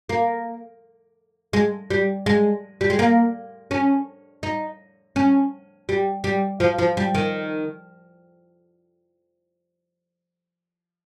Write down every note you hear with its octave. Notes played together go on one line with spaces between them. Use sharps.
A#3
G#3
G3
G#3
G3
G#3
A#3
C#4
D#4
C#4
G3
G3
F3
F3
G3
D#3